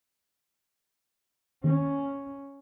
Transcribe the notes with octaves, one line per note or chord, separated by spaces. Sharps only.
D#2 C#4